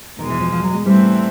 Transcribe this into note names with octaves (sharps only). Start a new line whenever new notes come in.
E2 B2 D#3 G#3
E3
F3
F3
F#3
G#3
A2 E3 G3 A3 C4